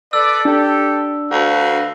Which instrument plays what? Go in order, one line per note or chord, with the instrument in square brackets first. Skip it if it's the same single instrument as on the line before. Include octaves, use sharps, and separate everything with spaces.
[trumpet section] A4 B4 D5 [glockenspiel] E6
[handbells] D4 [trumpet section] G4 A4
[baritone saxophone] D2 [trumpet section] F#4 B4 F5